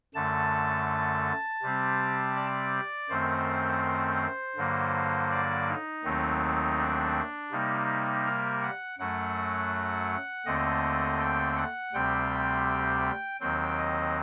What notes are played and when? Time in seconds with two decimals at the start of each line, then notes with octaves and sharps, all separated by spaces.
0.14 F#2 D3 A3 A5
1.62 C3 G3 C4
2.36 D5
3.09 F#2 D#3 A3 C4 C5
4.56 G2 D3 F#3 A#3
5.31 D5
5.67 D#4
6.04 D#2 D#3 F#3 A3 C4
6.78 D4
7.51 C3 G3 A#3 D#4
8.25 A#4
8.62 F#5
8.98 F#2 F#3 A3 F#5
10.46 D#2 D3 A3 C4 D#5
11.20 G5
11.57 F#5
11.93 D2 C3 G3 C4 G5
13.40 D#2 D#3 F#3 C4 G5
13.78 D#5